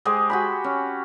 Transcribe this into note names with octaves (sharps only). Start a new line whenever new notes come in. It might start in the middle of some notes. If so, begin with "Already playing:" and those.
G#3 G4 G#4 C5
F#4 G4 B5
C#4